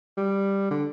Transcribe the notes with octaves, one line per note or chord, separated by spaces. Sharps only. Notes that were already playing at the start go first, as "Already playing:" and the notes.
G3
D3